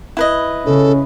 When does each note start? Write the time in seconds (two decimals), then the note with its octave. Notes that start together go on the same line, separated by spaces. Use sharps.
0.17 E4 B4 D#5
0.66 C#3 C#4 A4